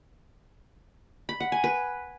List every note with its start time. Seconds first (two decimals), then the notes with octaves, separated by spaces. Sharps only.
1.29 B5
1.40 F#5
1.52 G#5
1.64 B4